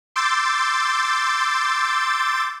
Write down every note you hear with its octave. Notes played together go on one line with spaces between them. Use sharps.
C6 D6 E6 G6 A6